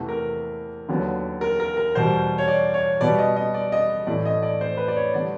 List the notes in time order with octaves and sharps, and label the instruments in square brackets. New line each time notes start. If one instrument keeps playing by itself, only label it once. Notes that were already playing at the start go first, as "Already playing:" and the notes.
Already playing: [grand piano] E2 C3 E3 A3
A#4
D#2 D3 F#3 B3
A#4
A#4
A#4
E2 B2 G3 C5
C#5
D5
C#5
B2 G3 B3 D5
D#5
D#5
D5
D#5
A2 E3 A3 D5
D#5
D5
C5
B4
D5
C#5
D3 G3 B3 D5